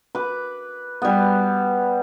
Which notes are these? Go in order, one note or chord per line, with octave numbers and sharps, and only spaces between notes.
B4 D6
G3 B3